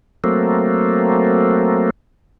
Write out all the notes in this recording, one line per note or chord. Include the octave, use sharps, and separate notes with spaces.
F#3 A3 A#3 C4